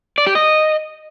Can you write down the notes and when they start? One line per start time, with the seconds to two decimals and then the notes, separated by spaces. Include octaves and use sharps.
0.18 D5
0.27 G4
0.35 D#5